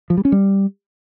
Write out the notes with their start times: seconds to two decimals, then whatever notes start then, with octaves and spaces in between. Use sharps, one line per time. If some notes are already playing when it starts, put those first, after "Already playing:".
0.10 F3
0.17 G3
0.25 C#4
0.32 G3